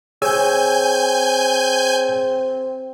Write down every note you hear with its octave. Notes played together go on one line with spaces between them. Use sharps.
C4 G#4 C#5 G#5 E6 G6